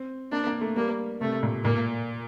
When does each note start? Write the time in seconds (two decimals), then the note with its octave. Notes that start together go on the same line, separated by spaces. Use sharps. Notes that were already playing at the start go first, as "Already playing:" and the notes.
Already playing: C4
0.32 A#3 D4
0.47 A#3
0.61 A3
0.76 G3 A#3
1.21 C3 A3
1.43 A#2
1.64 A#2 A#3